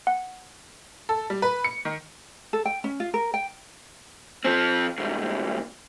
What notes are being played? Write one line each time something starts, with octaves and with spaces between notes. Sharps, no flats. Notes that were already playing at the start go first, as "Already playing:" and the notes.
F#5
A4
G3
B4
C#7
D#3
A4
G5
C#4
F4
A#4
G5
F3 C4
C2 G#2